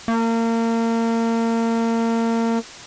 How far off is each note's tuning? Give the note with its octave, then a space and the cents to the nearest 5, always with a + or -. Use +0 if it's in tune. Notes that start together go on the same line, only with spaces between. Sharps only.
A#3 -30